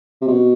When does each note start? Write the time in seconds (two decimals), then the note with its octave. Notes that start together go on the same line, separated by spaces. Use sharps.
0.21 C3
0.27 B2